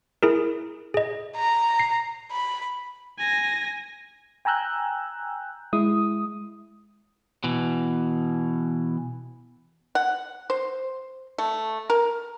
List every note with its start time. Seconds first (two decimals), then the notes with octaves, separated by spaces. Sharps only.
0.23 E4 G#4 A#4
0.94 G#4 D#5
1.37 A#5
1.79 C7
2.32 B5
3.19 G#5 A#6
4.45 G5 G#5 A#5 E6 F#6 G6
5.73 G#3 E4 D#6
7.44 B2 E3
9.95 F#5
10.50 C5
11.38 A3
11.90 A#4